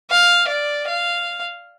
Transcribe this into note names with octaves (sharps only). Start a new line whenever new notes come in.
F5
D5
F5